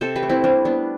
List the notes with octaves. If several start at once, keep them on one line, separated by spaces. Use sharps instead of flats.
C3 A4 C5
G4 B4
A3
C4 E4
G3 D4
B3 D4